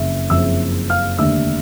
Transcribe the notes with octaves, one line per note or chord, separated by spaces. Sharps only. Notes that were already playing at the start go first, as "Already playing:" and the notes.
Already playing: F#1 F2 C#3 E5
F#1 F2 C#3 E5 E6
F5 F6
F1 D#2 D3 E5 E6